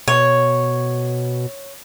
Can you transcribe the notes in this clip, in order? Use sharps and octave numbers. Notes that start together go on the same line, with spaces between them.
B2 C#5